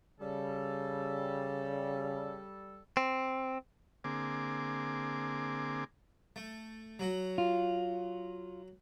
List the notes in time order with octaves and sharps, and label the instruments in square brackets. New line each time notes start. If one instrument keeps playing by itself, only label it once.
[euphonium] C#3 [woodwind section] G3 A4
[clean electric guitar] C4
[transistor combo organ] D3 A#3 C4 G#4 D6
[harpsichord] A3
F#3 F#4
[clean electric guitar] F4